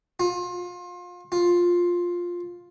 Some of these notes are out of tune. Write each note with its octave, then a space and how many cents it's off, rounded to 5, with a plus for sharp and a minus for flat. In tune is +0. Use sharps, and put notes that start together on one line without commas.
F4 +30
F4 +10